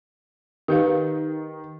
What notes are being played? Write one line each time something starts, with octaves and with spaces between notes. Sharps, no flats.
D#3 G4 B4 F5